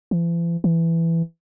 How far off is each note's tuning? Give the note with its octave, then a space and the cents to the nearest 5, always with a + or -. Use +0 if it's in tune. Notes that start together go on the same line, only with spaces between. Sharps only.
E3 +45
E3 +10